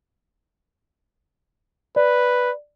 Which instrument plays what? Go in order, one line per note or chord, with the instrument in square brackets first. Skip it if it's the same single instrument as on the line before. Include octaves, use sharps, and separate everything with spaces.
[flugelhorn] B4 [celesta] D5